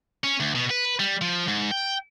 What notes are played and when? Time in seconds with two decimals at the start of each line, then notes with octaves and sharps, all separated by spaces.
0.24 C#4
0.40 D2
0.55 B2
0.70 B4
1.00 G3
1.21 F3
1.48 G#2
1.71 G5